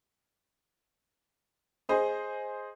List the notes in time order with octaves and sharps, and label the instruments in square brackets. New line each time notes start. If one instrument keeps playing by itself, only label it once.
[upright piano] G#4 C5 D#5